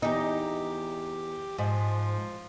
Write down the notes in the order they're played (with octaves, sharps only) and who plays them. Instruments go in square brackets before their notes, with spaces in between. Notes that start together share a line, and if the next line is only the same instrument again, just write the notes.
[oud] E2 D#4 [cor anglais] G4
[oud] G#2 [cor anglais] F3